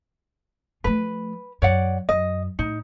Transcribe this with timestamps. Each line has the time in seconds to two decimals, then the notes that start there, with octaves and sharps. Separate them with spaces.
0.84 F3 A3 B4
1.62 F#2 C#5 D5 F#5
2.09 F#2 D#5
2.59 A2 D#4